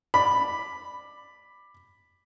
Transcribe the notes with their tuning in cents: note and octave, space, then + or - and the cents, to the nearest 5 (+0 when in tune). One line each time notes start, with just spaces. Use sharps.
D5 +10 B5 +0